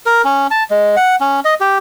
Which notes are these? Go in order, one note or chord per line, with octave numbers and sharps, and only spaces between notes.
A#4
C#4
A5
G#3
F#5
C#4
D#5
G4